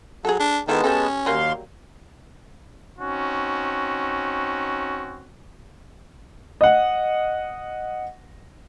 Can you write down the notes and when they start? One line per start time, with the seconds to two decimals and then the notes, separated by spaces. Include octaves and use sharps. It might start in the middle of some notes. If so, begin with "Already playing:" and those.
0.25 F#3 G#4 A4
0.40 D4
0.68 D#3 G#3 B3 E4 F4 A4 A5
0.84 C#4 G4 A4
1.26 D#2 F#3 G3 A#3 F5 C6
2.99 C4 C#4 D#4 F#4
6.61 D#5 F#5